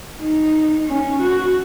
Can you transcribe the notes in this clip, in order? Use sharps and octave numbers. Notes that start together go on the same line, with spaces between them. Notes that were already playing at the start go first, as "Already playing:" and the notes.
D#4
C#4
F#4